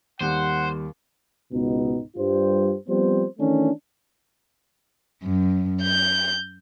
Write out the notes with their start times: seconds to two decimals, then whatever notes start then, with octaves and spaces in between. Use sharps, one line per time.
0.21 D#2 G3 C5 F#5
1.53 C#2 G#2 B2 B3 D#4
2.16 G2 G3 F4 G4 C5
2.88 F3 G3 B3 C4 C5
3.39 D#3 E3 A3 C#4 D4
5.23 F#2
5.81 G6